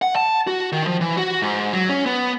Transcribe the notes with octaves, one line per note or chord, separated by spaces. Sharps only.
F#5
A5
F#4
D#3
F3
E3
F#4
G#2
F#3
C#4
B3